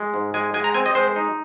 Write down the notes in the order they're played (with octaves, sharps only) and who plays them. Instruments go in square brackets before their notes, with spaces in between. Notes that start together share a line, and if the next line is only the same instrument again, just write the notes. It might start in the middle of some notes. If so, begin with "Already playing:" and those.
Already playing: [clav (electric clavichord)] G#3
G#2
G#3 G#5
G#3 G#5
A#5
C4 G#5
D#5
G#3 C5
D#4